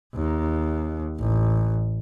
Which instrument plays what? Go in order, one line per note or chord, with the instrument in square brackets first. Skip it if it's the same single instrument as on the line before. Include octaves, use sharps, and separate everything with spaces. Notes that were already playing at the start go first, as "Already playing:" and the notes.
[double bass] D#2
A1